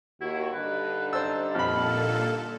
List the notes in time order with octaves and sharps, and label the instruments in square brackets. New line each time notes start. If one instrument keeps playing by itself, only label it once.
[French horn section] D#2 F#4 [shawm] E4
[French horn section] G2 D3 D#4 [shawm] B4
[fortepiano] C5 E6 [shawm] A5
[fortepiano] F2 B5 [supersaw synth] A#2 A4 [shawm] F5